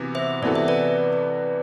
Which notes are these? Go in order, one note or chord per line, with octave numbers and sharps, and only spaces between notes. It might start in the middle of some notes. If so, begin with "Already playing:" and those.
Already playing: C3 E3 B3 F#4
C5 E5
C3 E3 B3 F#4 A4 D5
E5
B4 D5